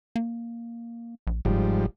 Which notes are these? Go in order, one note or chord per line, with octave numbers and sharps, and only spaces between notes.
A#3
A#1
G1 G#2 F3 G3